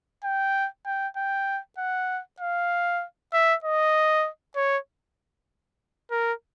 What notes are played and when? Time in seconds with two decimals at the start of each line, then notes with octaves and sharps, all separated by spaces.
0.24 G5
0.86 G5
1.17 G5
1.78 F#5
2.40 F5
3.33 E5
3.64 D#5
4.56 C#5
6.11 A#4